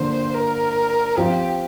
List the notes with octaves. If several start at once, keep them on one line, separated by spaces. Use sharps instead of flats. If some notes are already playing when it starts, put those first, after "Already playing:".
Already playing: D3 F3 A#3 C5
A#4
F3 C4 F4 G4